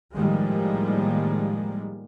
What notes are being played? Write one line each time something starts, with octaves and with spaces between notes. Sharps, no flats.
A2 D#3 F3 G3 G#3 A#3